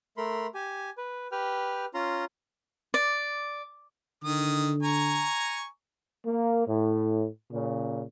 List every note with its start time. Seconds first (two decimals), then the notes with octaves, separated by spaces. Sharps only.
0.17 A3 A#4 B5 C6
0.54 G4 G#5
0.98 B4
1.32 G4 B4 G5 F6
1.94 C#4 F4 A#5 C6
2.94 D5
4.24 D3 D#3 D#6
4.83 G#5 A#5 C#6
6.25 A#3
6.66 A2
7.52 A#2 C#3